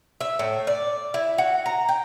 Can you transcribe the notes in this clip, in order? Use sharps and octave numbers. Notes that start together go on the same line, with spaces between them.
E5
A2
D5
E4
F#4
A#5
G5